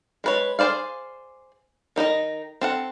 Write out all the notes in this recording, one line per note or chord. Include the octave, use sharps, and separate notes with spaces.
G#3 B4 C#5
G#4 B4 C5 D5 F5
D#3 D#4 F#4 D#5
C4 A4 F#5